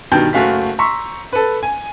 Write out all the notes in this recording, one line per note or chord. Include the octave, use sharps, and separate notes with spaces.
G2 B2 D#3 G5 G6
F#1 A3 F#4 F5 B6
A#5 C6 C#6 E6 B6
A4 B4
G#5